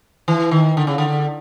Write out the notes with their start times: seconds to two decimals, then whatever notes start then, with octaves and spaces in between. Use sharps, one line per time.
0.28 E3
0.51 D#3
0.77 D3
0.87 C#3
0.98 D3